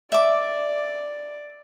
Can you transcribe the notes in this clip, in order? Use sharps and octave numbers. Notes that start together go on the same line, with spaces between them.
D5 E5 D6